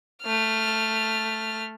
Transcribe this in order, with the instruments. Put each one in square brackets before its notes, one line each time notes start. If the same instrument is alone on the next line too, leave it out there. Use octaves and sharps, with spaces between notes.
[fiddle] A3 F6